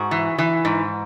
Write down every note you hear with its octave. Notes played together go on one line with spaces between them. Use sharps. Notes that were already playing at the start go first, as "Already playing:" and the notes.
Already playing: G#2 F#4
E3
E3
G#2